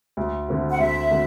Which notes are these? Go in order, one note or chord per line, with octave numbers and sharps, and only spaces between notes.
D2
D3 A3 C4 F#4
F#5
D2 E5
D3 A3 C4 F#4